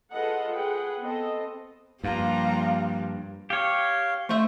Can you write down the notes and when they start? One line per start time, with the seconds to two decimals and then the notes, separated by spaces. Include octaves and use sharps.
0.11 F4 G#4 A4 B4 D#5 F#5
0.55 G#4 B4 F#5 G5
1.02 B3 C4 A4 D#5
2.04 G2 F3 G3 A#3 F4 F5 A#5
3.50 G4 C#5 F5
4.29 A3 C5 E5 C#6